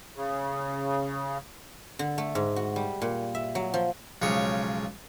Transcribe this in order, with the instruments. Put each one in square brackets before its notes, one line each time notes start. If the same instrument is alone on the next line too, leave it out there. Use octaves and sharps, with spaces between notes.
[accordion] C#3
[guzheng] D3
A3
G#2
F#4
G3
A#2
E5
F#3
F3
[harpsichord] B1 C#3 F3 G#3 C#5